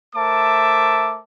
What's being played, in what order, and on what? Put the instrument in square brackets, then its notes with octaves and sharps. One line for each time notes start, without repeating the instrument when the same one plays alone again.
[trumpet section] A3 A#4 C5 E5 A5 D6